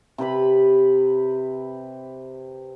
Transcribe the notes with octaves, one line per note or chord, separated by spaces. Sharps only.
C3 G4 B4 B5